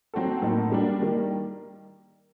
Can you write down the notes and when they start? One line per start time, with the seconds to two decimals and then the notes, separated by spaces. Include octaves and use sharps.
0.14 F#3 C4 F#4 A4
0.42 A2 F#3 A#3 D#4 A4
0.72 G3 A#3 D4
1.01 D#3 G3 A#3